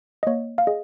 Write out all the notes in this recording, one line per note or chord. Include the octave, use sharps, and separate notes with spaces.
D#5
A#3 C#5
F5
G#4 D#5